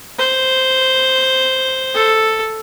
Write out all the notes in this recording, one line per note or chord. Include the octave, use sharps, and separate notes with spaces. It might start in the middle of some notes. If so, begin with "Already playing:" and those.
C5
A4